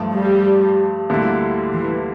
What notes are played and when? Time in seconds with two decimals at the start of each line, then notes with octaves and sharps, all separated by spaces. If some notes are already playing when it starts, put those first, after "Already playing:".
Already playing: G2 F3 A3
0.14 G3
1.10 D2 D3 G3 A#3 E4
1.73 E3